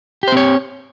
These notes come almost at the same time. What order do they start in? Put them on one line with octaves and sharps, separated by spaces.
G4 C5 C4 C#5